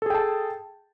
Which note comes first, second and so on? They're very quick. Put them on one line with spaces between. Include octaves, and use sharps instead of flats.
A4 G#4 G5 A5